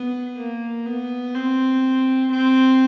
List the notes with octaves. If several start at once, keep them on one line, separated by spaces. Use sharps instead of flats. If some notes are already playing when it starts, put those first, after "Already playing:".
Already playing: B3
A#3
B3
C4
C4